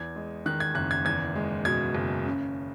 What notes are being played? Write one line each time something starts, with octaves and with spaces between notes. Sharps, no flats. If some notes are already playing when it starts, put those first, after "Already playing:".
Already playing: E2 G#6
G#3
D#3 F#6
G#6
F#1 F#6
G#6
E2 G#6
G#3
B2 G#6
F#1
C#3